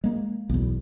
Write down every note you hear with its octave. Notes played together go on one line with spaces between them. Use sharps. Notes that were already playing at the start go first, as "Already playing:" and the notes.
G#3 A#3
B1 E2